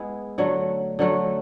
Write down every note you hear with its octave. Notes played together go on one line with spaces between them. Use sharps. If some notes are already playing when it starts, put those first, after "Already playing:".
Already playing: G#3 B3 E4 G#4
D3 F#3 A3
D3 F#3 A3